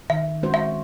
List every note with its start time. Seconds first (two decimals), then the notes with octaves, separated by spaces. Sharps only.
0.10 D#3 E5
0.43 G#3 C#4 F#4 C5
0.54 E5